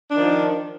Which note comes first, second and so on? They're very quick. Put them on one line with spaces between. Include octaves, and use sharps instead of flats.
D4 D#3 F3